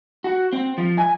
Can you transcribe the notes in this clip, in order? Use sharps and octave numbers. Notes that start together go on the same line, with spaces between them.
F#4
C4
F3
G#5